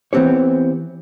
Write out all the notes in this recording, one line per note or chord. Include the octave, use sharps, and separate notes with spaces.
E3 B3 C4 G4 C#5